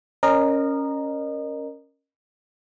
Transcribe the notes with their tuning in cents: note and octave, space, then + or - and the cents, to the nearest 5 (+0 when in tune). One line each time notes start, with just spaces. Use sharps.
C#4 -5 A#4 +0 D#5 -30